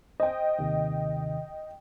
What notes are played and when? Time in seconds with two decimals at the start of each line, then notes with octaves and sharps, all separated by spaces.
0.20 C5 D#5 G5
0.59 D#2 C3 D#3